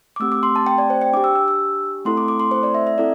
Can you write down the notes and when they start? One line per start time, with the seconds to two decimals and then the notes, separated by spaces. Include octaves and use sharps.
0.16 D6
0.20 A3 C4 G4 E6
0.32 D6
0.43 C6
0.56 A5
0.67 G5
0.78 D5
0.90 C5
1.01 G5
1.14 D4 G4 D6
1.24 E6
1.35 E6
1.48 E6
2.05 A3 C4 E4 A4 C6
2.17 D6
2.28 D6
2.40 C6
2.51 C5
2.63 D5
2.75 E5
2.87 E5
2.98 C4 E4 A4 D5